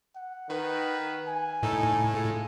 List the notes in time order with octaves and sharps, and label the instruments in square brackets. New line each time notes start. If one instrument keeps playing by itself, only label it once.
[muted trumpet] F#5
[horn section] D#3 B4
[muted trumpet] G#5
[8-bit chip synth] A2 [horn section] D#4 A4
[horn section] G#3 F4 A4